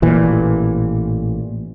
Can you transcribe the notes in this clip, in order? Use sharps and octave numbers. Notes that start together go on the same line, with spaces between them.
A1 A#2 E3